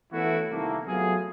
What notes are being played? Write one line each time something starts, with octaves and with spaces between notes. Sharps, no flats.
E3 A3 B3 C#4 E4 F#4
C2 D#3 E3 A3 A#3
F#3 A3 B3 F4 G#4